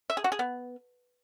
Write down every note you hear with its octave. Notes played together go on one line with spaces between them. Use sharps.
E5
G#4
F#4
G#4
B3